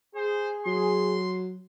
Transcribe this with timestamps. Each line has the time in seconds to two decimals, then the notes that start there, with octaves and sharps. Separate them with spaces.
0.15 G#4 C5
0.66 F#3 C6